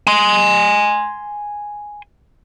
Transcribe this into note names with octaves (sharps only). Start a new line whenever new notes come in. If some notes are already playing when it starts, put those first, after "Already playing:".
G#5 C6